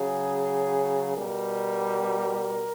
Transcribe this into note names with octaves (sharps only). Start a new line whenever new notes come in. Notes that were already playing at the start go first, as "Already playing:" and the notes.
Already playing: C#3 F#3 G#4
B2 G3 A#4